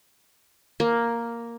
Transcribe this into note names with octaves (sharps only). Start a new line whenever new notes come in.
A#3